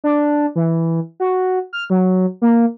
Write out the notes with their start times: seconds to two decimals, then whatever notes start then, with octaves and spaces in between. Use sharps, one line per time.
0.04 D4
0.56 E3
1.20 F#4
1.73 F6
1.90 F#3
2.42 A#3